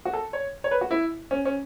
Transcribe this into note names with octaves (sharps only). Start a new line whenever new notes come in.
F#4
A4
C#5
C#5
B4
F#4
E4
C#4
C#4